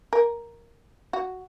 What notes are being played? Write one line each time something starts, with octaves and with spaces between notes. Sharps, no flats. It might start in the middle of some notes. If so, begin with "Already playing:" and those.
A#4
F#4